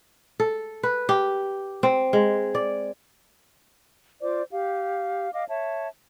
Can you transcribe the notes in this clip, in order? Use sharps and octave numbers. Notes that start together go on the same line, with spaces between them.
A4
B4
G4
C4
G#3
D5
F4 C5 D5 D6
G4 F5
D#5 F5 D6
C#5 E5 A5